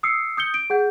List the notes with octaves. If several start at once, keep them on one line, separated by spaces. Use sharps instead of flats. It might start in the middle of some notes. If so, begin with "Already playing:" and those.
D#6 E6 C7 C#7
D#6 G6 C#7 G7
D7
G#4 F#5 G6